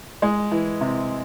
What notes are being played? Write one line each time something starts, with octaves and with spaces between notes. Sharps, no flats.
G#3
E3
C3